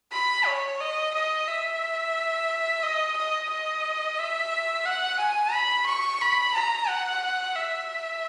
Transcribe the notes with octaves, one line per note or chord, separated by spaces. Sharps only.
B5
C#5
D#5
D#5
E5
D#5
D#5
D#5
E5
F#5
G#5
B5
C#6
B5
A#5
F#5
E5